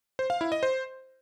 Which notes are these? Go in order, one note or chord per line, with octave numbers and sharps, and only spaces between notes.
C5
F5
E4
D#5
C5